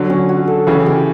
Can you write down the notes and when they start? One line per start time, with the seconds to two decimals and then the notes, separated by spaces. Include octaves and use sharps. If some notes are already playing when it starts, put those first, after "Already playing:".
Already playing: D3 F#3
0.10 C#4
0.29 F#4
0.47 A4
0.67 C#3 E3 G4
0.86 G4